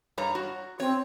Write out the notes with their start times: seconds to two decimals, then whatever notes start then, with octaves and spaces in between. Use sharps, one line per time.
0.18 G2 C#5 A#5
0.35 F#4
0.80 C4 C#5